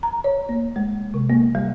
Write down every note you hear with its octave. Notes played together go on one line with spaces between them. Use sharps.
A#5
C#5
A#3
G#3
C3
A#3
G3